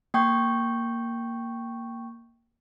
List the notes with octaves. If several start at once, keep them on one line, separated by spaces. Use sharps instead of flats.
A#3 G5 C#6 G6